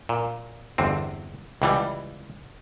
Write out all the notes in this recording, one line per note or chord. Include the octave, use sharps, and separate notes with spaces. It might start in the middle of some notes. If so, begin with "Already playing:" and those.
A#2
G1 E2 C4
C#2 E3 G3